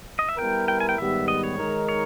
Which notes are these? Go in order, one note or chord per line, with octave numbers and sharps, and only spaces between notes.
D#5
E5
G3 B3 E4 A#4 G5
G5
G#5
G5
G#2 D#3 G3 B3 G4 E5
D#5
C#5
D#3 G#3 D#4 A#4
C#5